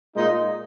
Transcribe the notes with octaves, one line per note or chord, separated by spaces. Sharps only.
A#2 G#3 D#4